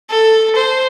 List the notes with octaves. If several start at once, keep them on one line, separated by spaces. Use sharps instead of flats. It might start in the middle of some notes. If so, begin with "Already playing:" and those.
A4
C5